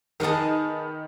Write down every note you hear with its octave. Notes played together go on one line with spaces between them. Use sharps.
D#3 G#4 B4 D#5 A5